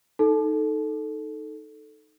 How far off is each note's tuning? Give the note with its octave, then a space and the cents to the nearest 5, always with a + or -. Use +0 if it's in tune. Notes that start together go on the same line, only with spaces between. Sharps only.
D#4 +0 A4 -5